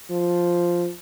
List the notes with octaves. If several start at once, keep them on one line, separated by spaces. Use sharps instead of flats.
F3